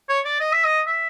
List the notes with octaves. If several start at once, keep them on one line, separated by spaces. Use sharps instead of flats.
C#5
D5
D#5
E5
D#5
E5